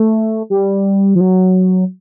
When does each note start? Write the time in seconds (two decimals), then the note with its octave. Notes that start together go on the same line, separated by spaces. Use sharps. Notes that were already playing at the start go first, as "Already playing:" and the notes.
Already playing: A3
0.50 G3
1.15 F3
1.21 F#3